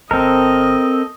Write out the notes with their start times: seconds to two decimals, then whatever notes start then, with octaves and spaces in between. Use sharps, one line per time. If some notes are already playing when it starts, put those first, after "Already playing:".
0.11 G1 C4 A4 A#4 D#5